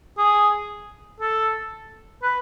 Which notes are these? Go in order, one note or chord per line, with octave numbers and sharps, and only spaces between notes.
G#4
A4
B4